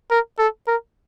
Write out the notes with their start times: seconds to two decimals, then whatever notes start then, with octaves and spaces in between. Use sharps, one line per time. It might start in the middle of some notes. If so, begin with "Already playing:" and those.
0.11 A#4
0.39 A4
0.67 A#4